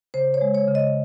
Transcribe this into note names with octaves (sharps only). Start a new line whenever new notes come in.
C#3 C5
C#5
G#3
C#5
C#3
D#5